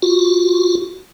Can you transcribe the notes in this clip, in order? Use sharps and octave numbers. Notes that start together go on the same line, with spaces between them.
F4 F#4